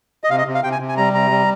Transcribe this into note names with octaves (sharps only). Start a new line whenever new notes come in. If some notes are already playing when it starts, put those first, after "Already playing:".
D#5
C3 F5
D#5
C3
F5
C3 G5
G#5
C3
G#5
G3 A#5
C3 A#5
G3